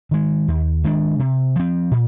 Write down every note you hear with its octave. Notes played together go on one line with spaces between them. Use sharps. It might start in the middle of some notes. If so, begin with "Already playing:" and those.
D#3 G#3
D#2
D#3 G#3 D4
C3
F3 C4
A#2